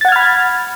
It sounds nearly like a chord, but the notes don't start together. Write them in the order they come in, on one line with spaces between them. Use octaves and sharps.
A6 F#5 G#6 F6 B5